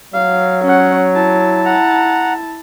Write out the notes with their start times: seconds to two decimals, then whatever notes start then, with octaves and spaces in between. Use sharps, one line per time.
0.14 F#3 F5
0.64 C#4 F#5
1.14 E4 A5
1.65 F#5 A#5